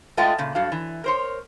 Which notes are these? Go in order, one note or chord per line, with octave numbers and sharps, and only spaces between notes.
G#3 A3 F4 D#5 G5
A#2 C#3
G2 F#3 F#4 A4 F5
E3
A#4 C5 C#5